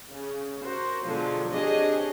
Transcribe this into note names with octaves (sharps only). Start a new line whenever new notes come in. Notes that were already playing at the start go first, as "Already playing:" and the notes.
C#3
F#4 A#4 C5
B2 D3 F3 F#3 G#3
C4 D4 G4 G#4 C#5 D#5